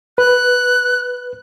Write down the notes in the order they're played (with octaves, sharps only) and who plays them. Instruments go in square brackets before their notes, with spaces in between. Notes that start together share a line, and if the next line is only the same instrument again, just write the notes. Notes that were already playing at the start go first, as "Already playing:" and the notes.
[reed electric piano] B4 [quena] F#6